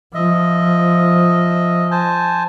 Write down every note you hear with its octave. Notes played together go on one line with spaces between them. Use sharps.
F3 D#5 E5
C5 G#5 A5